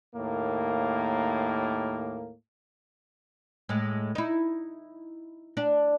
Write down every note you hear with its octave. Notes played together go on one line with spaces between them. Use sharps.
D#2 A2 A#3
A2 G#3
D#4 E4
D4